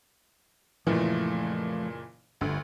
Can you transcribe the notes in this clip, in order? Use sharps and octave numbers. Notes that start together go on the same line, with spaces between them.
F#1 A#2 E3 F3 A3
G1 D2